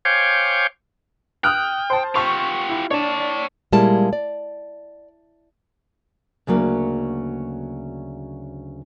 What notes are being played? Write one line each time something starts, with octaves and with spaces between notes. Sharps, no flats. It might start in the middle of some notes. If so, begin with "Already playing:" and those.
C5 C#5 F5 G5 G#5 D6
G5 D#6 F6 F#6
C5 A5
F4 G4 C#6
E4
D4 C#5 A5
A#2 G3 G#3 A#3 E4 A5
D5
D2 C#3 F#3 A#3